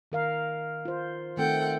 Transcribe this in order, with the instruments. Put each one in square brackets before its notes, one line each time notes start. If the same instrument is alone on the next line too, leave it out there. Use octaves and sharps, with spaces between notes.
[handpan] D#3 A#4 F5
F4 C5
[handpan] D#3 A3 C4 [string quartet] A4 F#5 G5